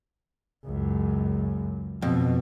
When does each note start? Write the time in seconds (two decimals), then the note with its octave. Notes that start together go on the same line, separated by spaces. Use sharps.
0.65 C#2 F#2
2.02 F2 B2